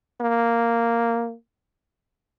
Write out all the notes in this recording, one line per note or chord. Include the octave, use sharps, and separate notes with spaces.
A#3